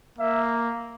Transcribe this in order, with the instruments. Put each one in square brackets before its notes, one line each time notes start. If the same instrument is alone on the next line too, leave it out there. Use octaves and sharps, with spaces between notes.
[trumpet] A#3 [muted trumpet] E5